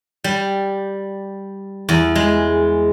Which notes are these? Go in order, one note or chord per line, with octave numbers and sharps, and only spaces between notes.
G3
E2
G#3